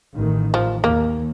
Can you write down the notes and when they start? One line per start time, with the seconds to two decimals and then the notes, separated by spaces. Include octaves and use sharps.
0.14 A1 D#3
0.54 F3
0.84 D#2 A#3